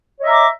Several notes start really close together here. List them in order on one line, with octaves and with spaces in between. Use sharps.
C#5 D#5 E5 A#5 D6